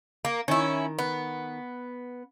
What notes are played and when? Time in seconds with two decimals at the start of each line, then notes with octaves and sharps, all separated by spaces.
0.25 A#3
0.48 D#3 C#4 E4
0.99 B3